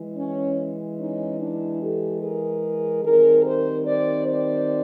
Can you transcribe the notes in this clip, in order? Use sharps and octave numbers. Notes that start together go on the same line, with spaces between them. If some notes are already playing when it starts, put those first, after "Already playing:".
Already playing: E3 G#3
C#4
C#4 D#4
D4 E4
G4 A4
G#4 A#4
D#3 G3 C4 G#4 A#4
A#4 C5
C5 D5
C5 D5